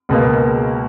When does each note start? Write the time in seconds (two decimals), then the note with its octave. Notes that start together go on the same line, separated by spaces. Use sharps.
0.09 C#2 B2 A#3